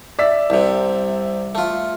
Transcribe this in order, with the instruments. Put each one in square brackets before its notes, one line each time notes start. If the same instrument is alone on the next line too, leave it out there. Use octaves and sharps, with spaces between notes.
[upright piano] D5 E5 B6
[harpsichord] C2 C3
A3 F4